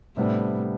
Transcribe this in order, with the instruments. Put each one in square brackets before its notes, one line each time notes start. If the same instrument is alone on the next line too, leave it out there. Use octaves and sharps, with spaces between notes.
[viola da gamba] A2 [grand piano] C3 G3 B3 D4